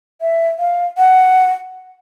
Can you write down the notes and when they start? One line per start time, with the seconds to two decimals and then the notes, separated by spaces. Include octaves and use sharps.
0.21 E5
0.59 F5
0.98 F#5